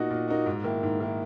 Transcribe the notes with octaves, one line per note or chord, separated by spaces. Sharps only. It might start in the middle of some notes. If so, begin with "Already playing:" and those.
Already playing: A#2 A#3 D#4 F#4
A#2
A#3 D#4 F#4
G#2
D#3 A#3 E4
G#2
D#3 A#3 E4